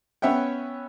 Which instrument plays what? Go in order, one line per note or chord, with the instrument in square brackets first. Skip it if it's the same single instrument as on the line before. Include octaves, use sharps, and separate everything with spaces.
[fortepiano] B3 C#4 C#5 E5 F#5 G5